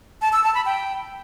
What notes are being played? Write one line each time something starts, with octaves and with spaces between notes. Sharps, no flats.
A5
E6
A5
B5
G5